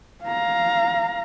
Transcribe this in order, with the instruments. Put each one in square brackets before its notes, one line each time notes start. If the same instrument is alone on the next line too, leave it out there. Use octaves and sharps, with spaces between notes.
[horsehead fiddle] F5 A#5